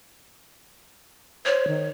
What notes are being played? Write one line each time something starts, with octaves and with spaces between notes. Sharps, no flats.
C5 C#5
D#3